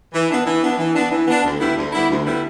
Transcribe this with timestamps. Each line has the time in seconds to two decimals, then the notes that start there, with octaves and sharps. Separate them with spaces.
0.12 E3
0.29 B3 D4
0.46 E3
0.62 B3 D4
0.78 E3
0.94 B3 D4
1.10 E3
1.27 B3 D4
1.44 D2
1.60 D3 G3 B3 E4
1.76 D2
1.92 D3 G3 B3 E4
2.09 D2
2.25 D3 G3 B3 E4